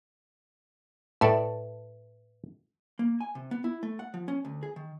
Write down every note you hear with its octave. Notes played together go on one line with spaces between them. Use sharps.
A2 A4 B4 D5 E5 A5
A#3
G#5
C3
B3
E4
A3
F#5
F3
C#4
D2
G#4
D#3